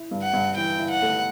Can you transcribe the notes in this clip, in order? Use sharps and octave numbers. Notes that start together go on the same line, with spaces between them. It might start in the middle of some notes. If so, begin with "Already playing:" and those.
Already playing: E4
G2
F#5
G2
E3 G5
E4
F#5
A3